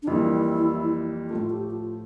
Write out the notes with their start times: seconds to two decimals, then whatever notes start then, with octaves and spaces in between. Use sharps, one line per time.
0.03 D4
0.07 F2 E3 G3 A#3 E4
1.30 A2 F3 A3 F4
1.50 G4
1.71 F4